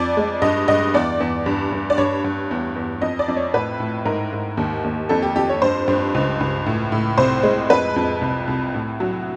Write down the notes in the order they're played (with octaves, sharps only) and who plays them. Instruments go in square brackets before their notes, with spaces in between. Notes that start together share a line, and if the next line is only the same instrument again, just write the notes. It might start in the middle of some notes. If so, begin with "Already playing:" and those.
Already playing: [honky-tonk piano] F2 D5
G#3
G2 D#5
G2 D#5
E2 D5
E2
G2
G2
D5
G2 C#5
G2
E2
E2
F2 D#5
D5
F2
C#5
A2 B4
A2
G#2 A#4
G#2
D#2
D#2
F2 A4
G4
F2 G4
C#5
G2 C5
G2
C#2
C#2
A2
A2
C2 C5
G#3
F2 B4
F2
C2
C2
A2
F#3